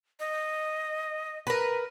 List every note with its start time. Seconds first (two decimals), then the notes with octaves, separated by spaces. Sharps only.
0.20 D#5
1.47 A#4 B4